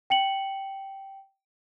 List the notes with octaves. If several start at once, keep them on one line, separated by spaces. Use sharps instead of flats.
G5 C#7 F#7